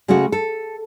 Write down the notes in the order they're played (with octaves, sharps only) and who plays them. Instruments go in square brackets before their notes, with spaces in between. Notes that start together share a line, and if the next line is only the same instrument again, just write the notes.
[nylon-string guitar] C#3 G#3 A3 C#4 F#4
A4